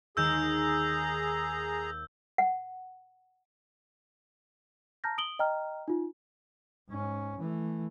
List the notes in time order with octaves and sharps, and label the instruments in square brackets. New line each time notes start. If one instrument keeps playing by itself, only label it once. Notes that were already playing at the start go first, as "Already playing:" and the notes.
[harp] D#2 D#3 G#3 [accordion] G#4 A#5 [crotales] E6 G6
[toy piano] F#5
[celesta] A5 A#5 F6 G6 A#6
D#6 D7 F#7 G7
D#5 G5 A#5 F6
D#4 F4
[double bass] G#2 C#4
E3 A3